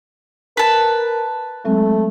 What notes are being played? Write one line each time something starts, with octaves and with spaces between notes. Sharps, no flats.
A#4 B4 A5
F#3 G#3 A3 C4